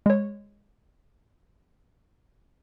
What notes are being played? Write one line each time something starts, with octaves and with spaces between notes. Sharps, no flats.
G#3 C#5